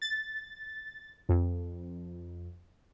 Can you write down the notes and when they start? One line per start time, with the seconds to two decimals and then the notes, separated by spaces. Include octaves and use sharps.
0.02 A6
1.29 F2